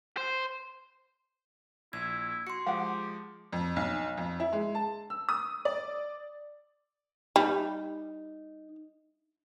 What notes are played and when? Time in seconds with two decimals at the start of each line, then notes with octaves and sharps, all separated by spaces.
0.17 C5
1.93 A#1 E4 G#6
2.47 F#4 C6 C#7
2.67 F3 G#3 G4 F5 F#5
3.53 F2
3.76 B1
4.17 F2
4.40 E4
4.53 G#3
4.75 A5
5.10 E6
5.29 D#6
5.65 D5
7.36 G3 D#4